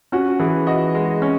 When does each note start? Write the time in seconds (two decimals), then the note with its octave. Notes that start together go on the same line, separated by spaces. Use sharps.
0.12 C#4 F#4
0.39 E3 G#4
0.67 F#4 D#5
0.95 G#3
1.22 C#4